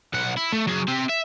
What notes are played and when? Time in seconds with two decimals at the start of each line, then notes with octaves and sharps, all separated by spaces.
0.14 B1 F#5
0.37 E4
0.52 A3
0.67 F#3 G#4
0.88 C4 G4
1.09 E5